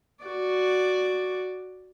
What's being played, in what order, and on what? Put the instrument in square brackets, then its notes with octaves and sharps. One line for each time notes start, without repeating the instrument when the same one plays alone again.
[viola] F#4 D5